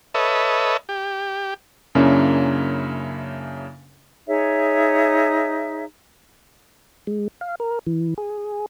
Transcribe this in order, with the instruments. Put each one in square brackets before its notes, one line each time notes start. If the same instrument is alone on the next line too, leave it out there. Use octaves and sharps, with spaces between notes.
[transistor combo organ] A4 B4 C#5 D#5 E5
G4
[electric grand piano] F#2 C#3 A#3 C#4 D4 E4
[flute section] D#4 G#4 C#5 E5
[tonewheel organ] G#3
F5
A#4
E3
G#4